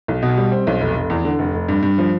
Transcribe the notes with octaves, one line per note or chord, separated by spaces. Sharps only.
B1
B2
G3
C4
B1
F1
F1
E2
D3
F1
F1
G2
G2
F3